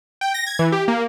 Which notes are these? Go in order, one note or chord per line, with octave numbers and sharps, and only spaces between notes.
G5
A#6
G#6
E3
G4
A#3